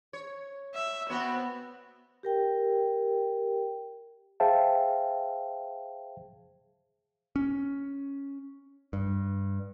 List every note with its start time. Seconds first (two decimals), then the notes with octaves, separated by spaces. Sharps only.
0.13 C#5
0.74 E5
1.10 B3 C4 F#4 C#5
2.23 G4 A#4 G5
4.40 G#4 C5 E5 F5 G5 A5
7.36 C#4
8.93 G2